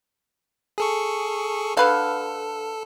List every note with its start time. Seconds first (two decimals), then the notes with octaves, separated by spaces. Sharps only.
0.78 G#4 A4 C#6
1.77 D3 A4 B4 F5